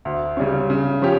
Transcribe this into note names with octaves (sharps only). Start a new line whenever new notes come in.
D2
C#3 G3 C#4
C#3
F3 C#4 G4